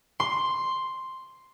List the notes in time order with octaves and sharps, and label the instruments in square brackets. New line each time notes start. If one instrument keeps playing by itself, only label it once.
[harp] C6